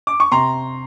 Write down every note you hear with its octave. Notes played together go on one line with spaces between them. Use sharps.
D6
C#6
C3 A#5 C6